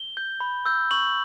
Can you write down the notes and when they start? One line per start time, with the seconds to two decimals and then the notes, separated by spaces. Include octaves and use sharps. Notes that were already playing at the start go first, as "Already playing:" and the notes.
Already playing: G7
0.17 G6
0.40 B5
0.65 E6 G6
0.91 C#6 F#7